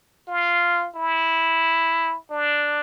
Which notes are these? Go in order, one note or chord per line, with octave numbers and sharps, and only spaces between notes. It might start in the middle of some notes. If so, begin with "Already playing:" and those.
F4
E4
D4